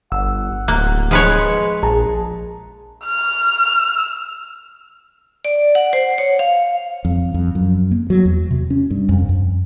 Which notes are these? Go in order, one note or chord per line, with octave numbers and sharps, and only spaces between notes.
G1 F#5 E6
D1 A#3 F#6
F3 G#3 B4 C#5
A#1 G#4 A5 A#5
F6
D5
F#5
C5
C#5
F5
F2
F2
F#2
A#3
F#3
E2
C3
C#4
G2
F2
F#2